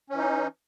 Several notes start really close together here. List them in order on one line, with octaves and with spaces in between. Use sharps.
C#4 E3 D#4